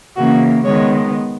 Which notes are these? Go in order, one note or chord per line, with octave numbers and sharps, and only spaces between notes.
C#3 E3 A#3 C#4 F#4
D#3 G#3 B3 C#5